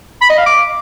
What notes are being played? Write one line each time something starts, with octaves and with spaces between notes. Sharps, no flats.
B5
D#5
F5
D6